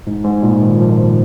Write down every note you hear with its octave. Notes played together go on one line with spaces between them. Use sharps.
G#2
G#2
A#2
D#3
F3